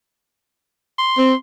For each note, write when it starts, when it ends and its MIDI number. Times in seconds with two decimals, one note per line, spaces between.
0.98 1.35 84
1.18 1.33 60